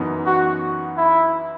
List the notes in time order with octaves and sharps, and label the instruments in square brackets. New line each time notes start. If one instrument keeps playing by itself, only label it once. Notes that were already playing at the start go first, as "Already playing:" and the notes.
Already playing: [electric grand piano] F#2 E3 B3 D#4
[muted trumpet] F#4
E4